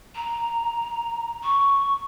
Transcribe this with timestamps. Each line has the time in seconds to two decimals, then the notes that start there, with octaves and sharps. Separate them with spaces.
0.15 A#5
1.43 C#6